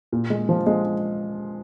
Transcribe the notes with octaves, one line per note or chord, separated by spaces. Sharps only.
A#2
G#3
F3
G#3